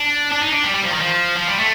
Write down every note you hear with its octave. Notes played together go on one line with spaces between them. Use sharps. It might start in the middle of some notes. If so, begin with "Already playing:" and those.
Already playing: D4
D4
D#4
D4
G3
G3
F3
D#3
F3
F3
G3
A3